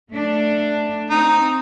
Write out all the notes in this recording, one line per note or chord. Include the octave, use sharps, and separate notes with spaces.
A3 D4
C4 D#4